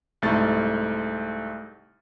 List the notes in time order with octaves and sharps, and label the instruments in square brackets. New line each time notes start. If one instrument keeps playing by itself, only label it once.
[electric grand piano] C2 G#2 A3 A6